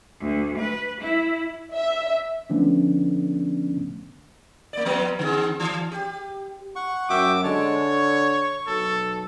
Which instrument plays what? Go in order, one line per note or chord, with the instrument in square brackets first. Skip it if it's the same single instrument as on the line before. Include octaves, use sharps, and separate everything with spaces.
[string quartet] D2
B4
E4
[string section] E5
[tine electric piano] D3 F3 A3 B3 C#4 D4
[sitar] A#3 D5
F3 G3 B3
D3 C4 G#4
E3
G4
[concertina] F#5 C#6
[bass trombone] F#2 [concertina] F#4 E5 G5 [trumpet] D6
[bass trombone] D3 [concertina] G#3 A5 [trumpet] C#5
[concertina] C#6
[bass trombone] B1 [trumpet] A4